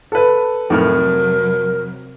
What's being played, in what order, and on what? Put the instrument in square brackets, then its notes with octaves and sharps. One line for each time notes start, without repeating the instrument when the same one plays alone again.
[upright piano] A4 B4
[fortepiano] F2 A2 F6 [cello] C3 F#3 [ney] A#4